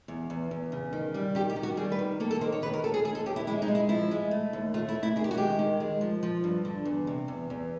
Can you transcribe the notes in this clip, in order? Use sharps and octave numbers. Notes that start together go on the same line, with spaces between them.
E2
E2
E2
C#3
D#3
G3
D#3 G4
G4
D#3
F#4
G3 G#4
B4
D#3
A#3 A4
A4
D#3 C5
C#5
D#2 B4
A#4
D#2 A4
G#4
D#2 G#4
A4
D#2 G4
E4
G#3 E4
D#4
G#3
E4
F3 E4
G#3
A3
D#2
A3 F4
E4
D#2
E4
D#3 G#4
G4
F#4
G#3 G4
D#3
G#3
F3
F3
G2
D3
E2
C3
E2
E2